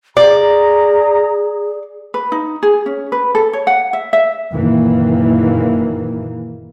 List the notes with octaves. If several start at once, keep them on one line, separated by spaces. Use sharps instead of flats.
G#4 D5 A#5
B4
D#4
G#4
C#4
B4
A4
C#5
F#5
E5
E5
F#1 A#2 D#3 E3 A#3